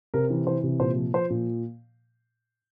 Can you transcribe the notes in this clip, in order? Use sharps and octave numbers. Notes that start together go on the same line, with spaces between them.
C3 A#4
E3
E3 C5
C3
A#2 C5
F3
F3 C5
A#2